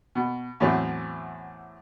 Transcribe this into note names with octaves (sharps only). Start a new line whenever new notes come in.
B2
E2 A2 F#3 C4